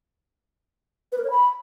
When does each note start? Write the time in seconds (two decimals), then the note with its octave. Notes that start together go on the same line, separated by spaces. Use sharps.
1.12 B4
1.18 A#4
1.24 C#5
1.30 B5